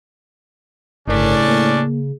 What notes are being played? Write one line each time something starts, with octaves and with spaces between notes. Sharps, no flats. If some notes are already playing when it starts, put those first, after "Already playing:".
G1 A2 C#3 C#4 D4 A#4 D5 B6
A#3